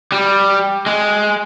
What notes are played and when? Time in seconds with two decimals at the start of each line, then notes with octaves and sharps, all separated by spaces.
0.12 G3
0.86 G#3